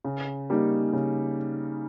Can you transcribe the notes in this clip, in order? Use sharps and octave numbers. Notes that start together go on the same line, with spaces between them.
C#3
G3 A#3 D#4
C#3